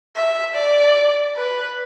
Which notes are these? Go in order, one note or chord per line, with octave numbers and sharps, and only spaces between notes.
E5
D5
B4